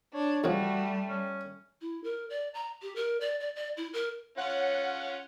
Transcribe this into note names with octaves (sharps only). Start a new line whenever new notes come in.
D4 C#5
E2 C#3 F3 G3 A3 F#4
C#4
E4
A#4
D5
A#5
G4
A#4
D5
D5
D5
E4
A#4
C#4 F4 C#5 F#5